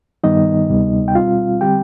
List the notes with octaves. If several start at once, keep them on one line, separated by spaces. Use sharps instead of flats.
G2 D#3 G3 B3 D#4 D#5
D2 C3 G3 B3
G5
B2 G3 C4 F4 F5
D3 G3 C4 G4 G5